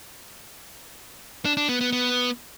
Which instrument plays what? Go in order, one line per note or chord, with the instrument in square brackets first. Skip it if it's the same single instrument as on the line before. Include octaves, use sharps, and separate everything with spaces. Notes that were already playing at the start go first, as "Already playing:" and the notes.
[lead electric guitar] D4
D4
B3
B3
B3